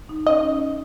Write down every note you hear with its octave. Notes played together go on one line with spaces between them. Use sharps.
D#4
C#4 D#5